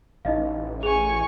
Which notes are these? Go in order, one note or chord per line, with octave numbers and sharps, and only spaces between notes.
A1 D#4 D#5 F5
G#4 G#5 C#6 F7